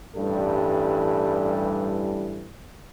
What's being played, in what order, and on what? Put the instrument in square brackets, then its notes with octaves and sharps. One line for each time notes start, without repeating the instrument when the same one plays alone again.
[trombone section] A1 G2 E3 G3 A4